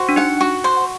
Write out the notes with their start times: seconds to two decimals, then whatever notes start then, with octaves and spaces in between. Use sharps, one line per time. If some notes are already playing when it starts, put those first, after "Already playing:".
Already playing: F#4 C5
0.09 D4
0.16 D#4 F#5
0.41 F#4
0.64 C5